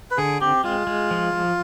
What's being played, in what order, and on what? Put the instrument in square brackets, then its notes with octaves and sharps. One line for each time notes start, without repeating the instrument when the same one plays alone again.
[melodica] B4
[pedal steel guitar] D3 [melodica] G#4
[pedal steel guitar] C4 [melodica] G4
[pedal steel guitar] G#3 [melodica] F4
[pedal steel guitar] G#3
F3
F3